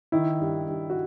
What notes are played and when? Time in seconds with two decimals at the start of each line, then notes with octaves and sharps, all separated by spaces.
0.12 D#3 E4
0.41 G2
0.67 G2
0.90 F#4